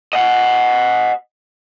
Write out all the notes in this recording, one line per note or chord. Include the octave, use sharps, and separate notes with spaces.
D#5 F#5